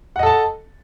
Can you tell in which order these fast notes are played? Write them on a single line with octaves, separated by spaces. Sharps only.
F#5 D#5 A4 A5